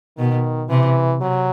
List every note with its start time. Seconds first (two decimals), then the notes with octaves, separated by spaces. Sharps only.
0.17 B2 D#3
0.69 C3 E3
1.21 C3 F#3